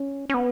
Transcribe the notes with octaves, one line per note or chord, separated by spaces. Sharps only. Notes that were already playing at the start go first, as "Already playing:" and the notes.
Already playing: C#4
C#4
B3